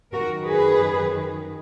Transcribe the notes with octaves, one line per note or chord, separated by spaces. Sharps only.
F#2 D#3 F#4 A#4
G#4 B4